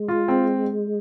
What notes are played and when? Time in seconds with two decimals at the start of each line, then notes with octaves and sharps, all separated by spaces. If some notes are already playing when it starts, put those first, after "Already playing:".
Already playing: G#3
0.08 F4
0.28 C4